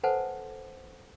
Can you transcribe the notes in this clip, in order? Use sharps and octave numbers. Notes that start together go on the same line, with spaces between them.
A4 B4 C5 F#5 G#5 A5